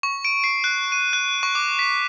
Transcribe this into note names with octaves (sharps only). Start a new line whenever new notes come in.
C#6
D7
C7
F#6
D#7
F#6
C#6
D6
B6